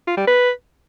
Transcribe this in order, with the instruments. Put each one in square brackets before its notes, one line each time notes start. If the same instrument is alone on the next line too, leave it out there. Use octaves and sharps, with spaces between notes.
[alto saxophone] F4
G3
B4